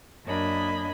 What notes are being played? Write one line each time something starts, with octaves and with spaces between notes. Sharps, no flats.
F#2 A#3 D4 D#5 B5 G#6